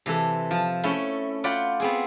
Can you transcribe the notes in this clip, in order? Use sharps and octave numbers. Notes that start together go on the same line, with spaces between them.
C3 E3 A4
F3 A5
A3 C#4 E4
F4 D5 F#5 G5 B5
B3 C4 G#4